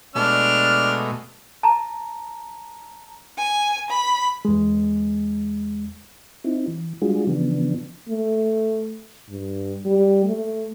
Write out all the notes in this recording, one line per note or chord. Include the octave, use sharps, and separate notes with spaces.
B2 G#3 A3 D4 F6
A5 A#5
G#5
B5
E2 G#3
C4 D#4 E4
E3
G3 G#3 D4 F4 F#4 G#4
C#3 E3 F3 B3 D4
A3
G2
G3
A3